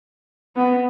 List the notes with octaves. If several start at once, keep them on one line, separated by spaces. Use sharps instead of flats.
B3